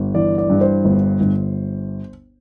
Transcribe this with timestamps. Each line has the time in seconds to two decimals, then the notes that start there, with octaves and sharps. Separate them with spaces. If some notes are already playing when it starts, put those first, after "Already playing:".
Already playing: G1
0.14 E3 D5
0.38 D5
0.50 G2
0.61 C5
0.85 G1
1.21 G1